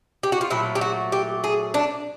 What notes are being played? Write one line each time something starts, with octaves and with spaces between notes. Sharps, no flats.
G4
F#4
F4
A#2 F#3 A3 E4
G4
F#4
G4
G#4
D4